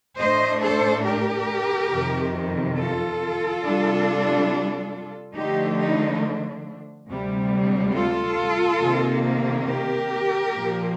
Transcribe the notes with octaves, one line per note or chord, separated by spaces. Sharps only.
A2 A3 D4 C5 D#5
A4 C5
G4 A#4
F2 C3 D#3
F4 A4
C3 G3 D4
D3 F3 A3 D4 D#4 G4
D#4
D2 C3 G3
F4 A4
C3 D#3 A#3
G4 A#4
A#2 F3 A#3